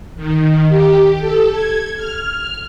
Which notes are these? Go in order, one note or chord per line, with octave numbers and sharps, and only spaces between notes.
D#3
G4
A4
G#6
F6